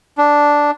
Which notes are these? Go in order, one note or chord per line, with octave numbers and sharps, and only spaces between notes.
D4